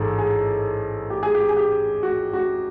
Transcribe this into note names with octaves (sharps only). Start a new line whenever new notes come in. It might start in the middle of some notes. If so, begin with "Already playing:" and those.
Already playing: A1 G#2 G#4 A4
G#4
G4
G#4
G4
G#4
G4
F#4
F#4